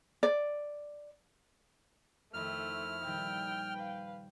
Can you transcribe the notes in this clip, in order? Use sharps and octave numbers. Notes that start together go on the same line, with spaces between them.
D5
F2 D#3 A3 E4 F6
A#2 D#3 G3 G5
B4 F5